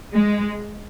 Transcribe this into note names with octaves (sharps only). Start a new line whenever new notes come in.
G#3